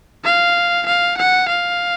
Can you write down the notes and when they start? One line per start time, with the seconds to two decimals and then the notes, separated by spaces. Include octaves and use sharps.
0.25 F5
0.87 F5
1.18 F#5
1.49 F5